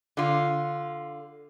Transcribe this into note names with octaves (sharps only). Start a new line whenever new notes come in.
D3 F4